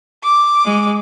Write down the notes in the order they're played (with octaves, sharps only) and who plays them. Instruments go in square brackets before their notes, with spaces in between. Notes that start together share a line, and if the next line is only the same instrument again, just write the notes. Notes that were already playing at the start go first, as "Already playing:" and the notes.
[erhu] D6
[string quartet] G#3